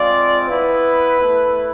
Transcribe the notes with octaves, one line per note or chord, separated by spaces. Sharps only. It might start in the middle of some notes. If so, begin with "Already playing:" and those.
Already playing: G#3 C4 F4 D5
B3 E4 B4
A3 E4